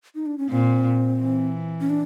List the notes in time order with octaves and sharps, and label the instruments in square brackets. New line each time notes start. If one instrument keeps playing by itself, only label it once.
[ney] D#4
D4
C#4
[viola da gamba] A#2 [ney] C4
[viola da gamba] E3
[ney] C#4
D4